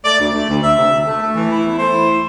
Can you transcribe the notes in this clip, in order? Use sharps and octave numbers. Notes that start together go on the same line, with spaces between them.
A3 D5
D2
A3
D2
D2 E5
C3
D2
A3
A3
E3
E4
E2
A3 C5
E4